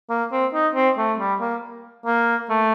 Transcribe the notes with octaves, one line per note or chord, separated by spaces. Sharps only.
A#3
C4
D#4
C4
A3
G3
A#3
A#3
A3